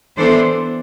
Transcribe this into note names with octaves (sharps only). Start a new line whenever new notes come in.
E3 B3 D4 A4 C5